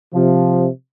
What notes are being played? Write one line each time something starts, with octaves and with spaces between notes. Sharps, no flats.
C3 F3